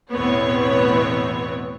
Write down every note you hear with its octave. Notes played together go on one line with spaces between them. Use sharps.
A1 E2 B2 B3 C4 C#5